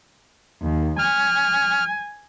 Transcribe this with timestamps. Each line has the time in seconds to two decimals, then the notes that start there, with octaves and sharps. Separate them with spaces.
0.62 D#2
0.99 G#5 F6